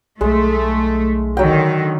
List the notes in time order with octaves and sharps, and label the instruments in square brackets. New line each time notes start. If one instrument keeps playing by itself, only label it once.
[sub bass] B1 [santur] G#3 [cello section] A3
[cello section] D3 D#3 [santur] F#3 G5